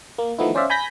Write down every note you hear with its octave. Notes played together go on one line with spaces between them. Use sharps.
A#3
D#3 F3 A3 B3 D#4 E4
C#4 C5 D5 E5 F5
G#5 B5 G6 A#6 B6